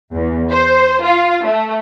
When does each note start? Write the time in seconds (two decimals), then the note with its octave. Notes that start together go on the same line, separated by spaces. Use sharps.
0.13 E2
0.51 C5
1.04 F4
1.45 A3